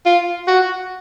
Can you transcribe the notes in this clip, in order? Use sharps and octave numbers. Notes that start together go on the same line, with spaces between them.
F4
F#4